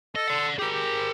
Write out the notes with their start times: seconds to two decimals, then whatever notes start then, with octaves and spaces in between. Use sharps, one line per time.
0.16 A4 D#5
0.28 D5 F#5
0.59 G4 G#4 A#4
0.73 G4